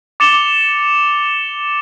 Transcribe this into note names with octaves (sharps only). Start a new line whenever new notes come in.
D6 A6 C#7 E7 F7 G7